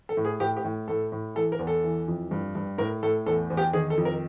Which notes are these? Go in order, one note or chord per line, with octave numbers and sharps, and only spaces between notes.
A4
A2
G#4
A2 G4
G4
A2
A2 A4
A2
E3 A4
A#4
E2
A4
E3
F2
G2
G2
A2 A#4
A2 A4
E2 A4
E2
G4
D#3 G#4
A4
F2
A#4